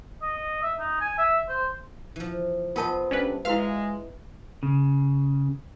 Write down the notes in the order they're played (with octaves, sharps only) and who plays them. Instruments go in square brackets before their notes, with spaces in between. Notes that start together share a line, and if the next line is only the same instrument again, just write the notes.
[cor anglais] D#5
E5
D#4
G#5
E5
C5
[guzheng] E3 F3
[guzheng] B3 C5 D#5 [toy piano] F4 A#4 A5
[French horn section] A#2 G3 A3 [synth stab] C#4 D4 B4
[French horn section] G#3 [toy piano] E4 F#4 B4 [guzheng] E5 [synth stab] F5 F6
[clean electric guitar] C#3